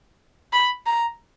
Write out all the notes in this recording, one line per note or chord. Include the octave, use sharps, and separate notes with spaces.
B5
A#5